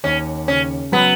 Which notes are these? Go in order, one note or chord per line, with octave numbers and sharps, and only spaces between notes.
D#2 C#4
C#3 C#4
F#3 B3